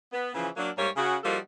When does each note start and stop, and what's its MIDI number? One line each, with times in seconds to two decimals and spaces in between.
0.12 0.30 59
0.35 0.49 49
0.35 0.49 52
0.35 0.49 53
0.57 0.69 54
0.57 0.69 58
0.57 0.69 62
0.77 0.89 44
0.77 0.89 55
0.77 0.89 58
0.77 0.89 73
0.97 1.16 49
0.97 1.16 66
1.24 1.37 53
1.24 1.37 55
1.24 1.37 58
1.24 1.37 63
1.24 1.37 66
1.24 1.37 69